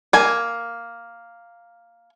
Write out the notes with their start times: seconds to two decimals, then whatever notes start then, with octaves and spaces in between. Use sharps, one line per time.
0.13 A#3 G#5